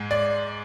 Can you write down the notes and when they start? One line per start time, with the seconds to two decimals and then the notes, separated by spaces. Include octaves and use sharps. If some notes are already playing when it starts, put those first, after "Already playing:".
Already playing: G#2 G#3
0.11 D5